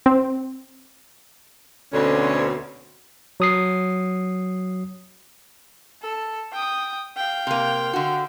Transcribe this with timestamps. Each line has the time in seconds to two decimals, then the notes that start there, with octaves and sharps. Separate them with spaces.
0.06 C4
1.93 D2 B2 D3 C4 C#4
3.40 F#3 D#6 C7
6.02 A4
6.53 G5 D#6
7.17 F5 G5
7.47 C3 A#3
7.93 D3 F#4